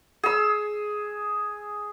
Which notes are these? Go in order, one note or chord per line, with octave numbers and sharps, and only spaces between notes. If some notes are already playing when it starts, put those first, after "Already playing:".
G#4 E6